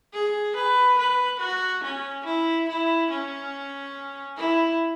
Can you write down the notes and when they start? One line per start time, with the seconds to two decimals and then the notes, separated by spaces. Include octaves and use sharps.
0.13 G#4
0.56 B4
0.98 B4
1.40 F#4
1.84 C#4
2.25 E4
2.68 E4
3.10 C#4
4.37 E4